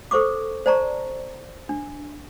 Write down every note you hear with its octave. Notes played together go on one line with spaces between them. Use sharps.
A4 C5 C#6 D6
C5 D5 A5 A#5 C#6
D4